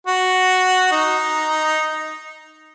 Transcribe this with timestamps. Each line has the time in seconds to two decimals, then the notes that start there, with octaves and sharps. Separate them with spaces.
0.07 F#4
0.92 D#4